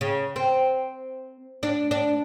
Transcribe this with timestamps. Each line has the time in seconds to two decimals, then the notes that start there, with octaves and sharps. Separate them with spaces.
0.01 C#3
0.36 C4
1.63 D4
1.91 D4